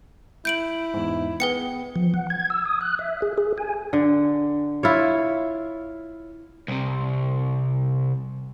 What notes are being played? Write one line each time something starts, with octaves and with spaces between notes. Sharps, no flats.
E4 G6 D7 F#7
E2 G#2
B3 G#4 B4 G5 C#7
F3
F#5
G#6
E6
D#6
F#6
E5
G#4
G#4
G#5
D3
E4 F4 C#5
C2 C3